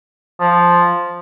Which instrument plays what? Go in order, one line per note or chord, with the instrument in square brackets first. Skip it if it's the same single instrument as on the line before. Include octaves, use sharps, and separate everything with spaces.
[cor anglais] F3